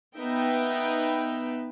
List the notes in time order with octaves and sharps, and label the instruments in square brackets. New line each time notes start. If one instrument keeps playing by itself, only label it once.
[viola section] B3 D#4 B4 E5 G5